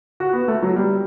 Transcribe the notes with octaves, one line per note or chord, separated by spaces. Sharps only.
F#4
B3
A3
F#3
G3